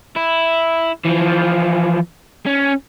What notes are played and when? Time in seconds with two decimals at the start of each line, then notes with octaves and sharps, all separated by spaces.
0.16 E4
1.05 E3 F3
2.47 C#4